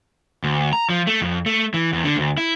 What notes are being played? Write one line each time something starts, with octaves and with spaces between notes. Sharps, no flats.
D2
A#5
F3
A3
F2
A3
E3
E2
D3
D2
E4